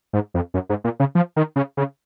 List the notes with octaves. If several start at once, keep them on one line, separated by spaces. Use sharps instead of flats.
G#2
F2
F#2
G#2
A#2
C#3
F3
D#3
C#3
C#3